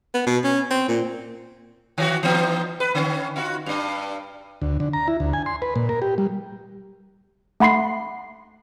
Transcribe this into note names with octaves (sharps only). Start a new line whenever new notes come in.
B3
B2
C#4
C4
A#2
D#3 F#4
E3 B3 D#4
B4
D3 C#4
D#4 F4 F#4
G2 D4
D2
D3
A#5
E4
D2
G#5
C6
B4
A#2
A#4
G4
G3
A3 F#5 B5 C6 C7